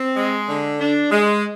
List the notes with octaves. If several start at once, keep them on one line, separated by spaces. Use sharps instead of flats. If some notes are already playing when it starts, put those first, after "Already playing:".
Already playing: C4
G#3
D3
D4
G#3